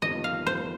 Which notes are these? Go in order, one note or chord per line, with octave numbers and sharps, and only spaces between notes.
G1 F2 D#3 G3 A#3 D#5
F5
C5